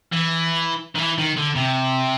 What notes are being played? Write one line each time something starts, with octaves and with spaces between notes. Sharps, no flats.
E3
D#3
E3
D#3
D3
C3